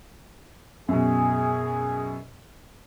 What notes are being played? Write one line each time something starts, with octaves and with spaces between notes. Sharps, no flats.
F#2 B2 G#4